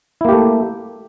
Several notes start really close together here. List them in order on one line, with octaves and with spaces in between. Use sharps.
E4 A#3 G4 A3